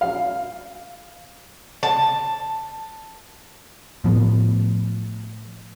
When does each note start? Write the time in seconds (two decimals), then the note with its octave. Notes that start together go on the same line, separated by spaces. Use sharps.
0.01 F5
1.83 A5
4.04 A2 F3 B3